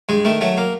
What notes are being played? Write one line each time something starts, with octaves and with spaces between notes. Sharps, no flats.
G2 G#3
D#3 A3
F#3 A3
A#3